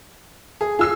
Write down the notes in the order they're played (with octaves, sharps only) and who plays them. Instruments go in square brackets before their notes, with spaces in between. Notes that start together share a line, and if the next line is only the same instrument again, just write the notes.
[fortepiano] G#4
[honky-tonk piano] F4 E6 C7 [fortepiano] G#4